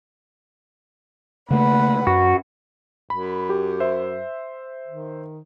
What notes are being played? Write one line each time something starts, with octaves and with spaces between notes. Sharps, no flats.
C#3 A3 A#3 B4 F#5
F#2 F#4
F#2 B5
G4
C5 E5
D#3